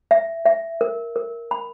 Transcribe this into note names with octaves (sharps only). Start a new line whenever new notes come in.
E5
E5
A#4
A#4
B5